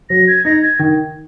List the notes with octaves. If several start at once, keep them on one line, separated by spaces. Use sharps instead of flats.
F#3 A#6
G#6
D#4 A#6
G#6
D#3